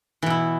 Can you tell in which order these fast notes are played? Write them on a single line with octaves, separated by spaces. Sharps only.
E3 B2 E4